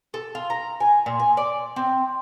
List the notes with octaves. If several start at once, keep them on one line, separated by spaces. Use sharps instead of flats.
A4
F4
A#5
G#5
A#2
G#5
D5
C4